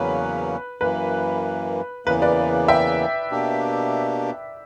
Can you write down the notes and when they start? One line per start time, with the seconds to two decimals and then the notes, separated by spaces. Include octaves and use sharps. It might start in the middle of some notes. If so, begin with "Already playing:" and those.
Already playing: E2 C#3 F#3 A#3 C#4 B4
0.81 F#2 E3 A#3 B4
2.06 E2 C#3 E3 A#3 B4
2.22 B4 D5
2.68 E5 G5
3.31 B2 A#3 D4 G4